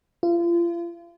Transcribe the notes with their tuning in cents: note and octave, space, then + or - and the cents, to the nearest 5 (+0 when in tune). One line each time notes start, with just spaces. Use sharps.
F4 -35